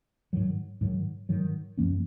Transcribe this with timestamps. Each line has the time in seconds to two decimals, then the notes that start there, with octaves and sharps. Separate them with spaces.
0.33 G#2 D#3 F#3
0.81 G#2 D#3 F#3
1.29 G#2 D#3 F#3
1.78 F#2 F3 A#3 C#4